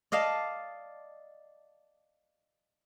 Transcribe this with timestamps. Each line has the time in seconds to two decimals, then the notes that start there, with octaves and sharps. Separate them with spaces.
0.12 D5 D#5 F5 A5